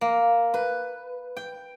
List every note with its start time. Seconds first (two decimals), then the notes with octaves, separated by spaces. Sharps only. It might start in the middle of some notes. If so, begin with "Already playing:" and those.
0.01 A#3
0.54 B4
1.37 G5